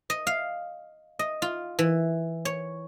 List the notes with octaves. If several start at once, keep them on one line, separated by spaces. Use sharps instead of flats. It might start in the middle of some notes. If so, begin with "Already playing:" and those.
D#5
F5
D#5
F4
E3
C#5